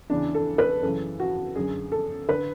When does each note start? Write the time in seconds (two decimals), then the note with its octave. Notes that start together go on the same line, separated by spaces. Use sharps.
0.10 E2 C#3 E3 D4
0.34 A4
0.58 B4
0.83 F#2 C#3 E3 A4
1.20 F#4
1.55 F#2 D3 G#4
1.92 A4
2.28 D3 B4